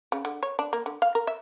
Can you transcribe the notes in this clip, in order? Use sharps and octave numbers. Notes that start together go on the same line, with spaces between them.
C#3
D3
C#5
D4
A#3
D3
F5
A#4
E5